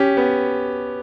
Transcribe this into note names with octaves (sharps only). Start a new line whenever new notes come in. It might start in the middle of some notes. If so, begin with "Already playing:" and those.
Already playing: C#4 G4
B3